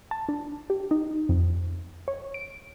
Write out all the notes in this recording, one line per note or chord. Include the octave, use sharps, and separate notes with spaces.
A5
D4
G4
D#4
F2
C#5
D7